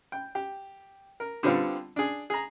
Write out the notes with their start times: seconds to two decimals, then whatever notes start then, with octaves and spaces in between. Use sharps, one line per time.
0.12 G5
0.35 G4
1.20 A#4
1.43 D3 G3 B3 C4 F4
1.96 D4 G#4
2.30 G#4 A#5